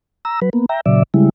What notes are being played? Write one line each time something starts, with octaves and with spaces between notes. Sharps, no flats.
A#5 E6
F#3 B4
A#3 B3
E5 G5 A#5
A#2 C#3 F#3 D5 E5
C#3 G3 G#3 E4